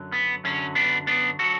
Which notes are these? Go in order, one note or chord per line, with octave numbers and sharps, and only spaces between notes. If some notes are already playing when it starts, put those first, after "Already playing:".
Already playing: F#2 D3 F#3
B3
F#2 D3 F#3 C#4
B3 D4
B3 D4
D3 F#3 F#4 A4